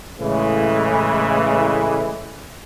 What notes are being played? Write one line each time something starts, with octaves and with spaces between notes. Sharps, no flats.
A2 C#3 E3 G#3